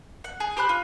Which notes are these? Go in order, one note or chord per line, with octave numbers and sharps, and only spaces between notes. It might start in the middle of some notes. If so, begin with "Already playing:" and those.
F#5
G#4
G4 C5 B5 F#6
F4